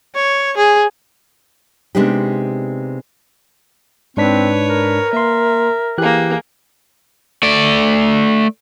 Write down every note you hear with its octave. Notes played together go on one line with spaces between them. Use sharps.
C#5
G#4
C3 G#3 B3 D4 D#4 G4
G#2 C4 D4 B4 C#5 B6
A#4
A#3 E5 C6
E3 A#3 G4 G#4 F#6
A3 D5